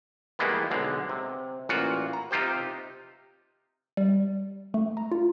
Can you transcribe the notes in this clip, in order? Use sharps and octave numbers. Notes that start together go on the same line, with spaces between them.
D#3 E3 G3 G#3 A#3 B3
B1 D3 G#3
C3
A1 A#2 F4 F#4 F#5
A#5
C3 D#4 F4 G4 C5
G3
A3
A#5
F4